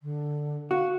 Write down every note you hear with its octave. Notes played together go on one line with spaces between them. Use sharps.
D3
F#4 F5